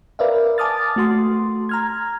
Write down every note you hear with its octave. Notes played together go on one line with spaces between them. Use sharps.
A#4 B4 D5 E5 F5
G#5 A5 D6 D#6 F6 A6
A3 F#4 C6
A#5 F6 G#6